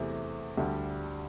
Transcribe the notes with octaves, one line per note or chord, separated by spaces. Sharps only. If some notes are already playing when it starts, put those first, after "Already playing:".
Already playing: E2 C3 E3 A3
D2 D3 G3